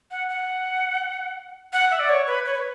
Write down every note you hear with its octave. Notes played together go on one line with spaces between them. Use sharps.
F#5
F#5
F#5
E5
D5
C#5
B4
C#5
B4